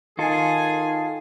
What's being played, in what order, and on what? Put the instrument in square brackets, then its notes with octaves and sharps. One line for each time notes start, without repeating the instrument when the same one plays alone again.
[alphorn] D#3 [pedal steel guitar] F4 A4 [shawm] G#4 [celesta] D#5 G#5